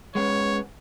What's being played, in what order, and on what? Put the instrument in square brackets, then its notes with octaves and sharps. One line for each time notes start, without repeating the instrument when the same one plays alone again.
[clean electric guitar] G#3 B3 C#4 [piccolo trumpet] C#5